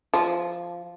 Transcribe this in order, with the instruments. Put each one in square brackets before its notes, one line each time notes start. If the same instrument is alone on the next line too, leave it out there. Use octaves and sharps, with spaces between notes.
[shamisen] F3